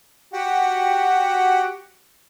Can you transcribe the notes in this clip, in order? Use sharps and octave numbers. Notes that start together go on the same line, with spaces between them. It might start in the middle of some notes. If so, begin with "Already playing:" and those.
F#4 G4 F#5 G5